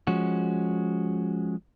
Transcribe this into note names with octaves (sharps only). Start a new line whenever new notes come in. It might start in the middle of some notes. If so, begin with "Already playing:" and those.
F3 G#3 C#4 F#4